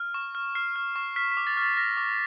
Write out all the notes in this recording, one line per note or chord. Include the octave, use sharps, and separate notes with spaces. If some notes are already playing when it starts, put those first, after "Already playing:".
Already playing: F6
C#6
F6
F6 C7
F6
C#6
F6 B6
B6
D6
A6
F6 A6
F6 A#6
D6